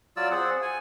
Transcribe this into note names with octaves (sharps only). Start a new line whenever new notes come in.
F#3 F4 D5 E6
C4 G#4 F#5
G#5